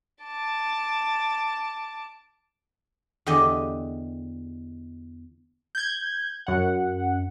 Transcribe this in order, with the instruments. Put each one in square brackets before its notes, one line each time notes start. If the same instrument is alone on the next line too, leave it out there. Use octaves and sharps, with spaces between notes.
[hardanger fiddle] A5 D6
[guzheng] E2 D3 G4 D#5
[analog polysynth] G6 G#6
F#2 F#5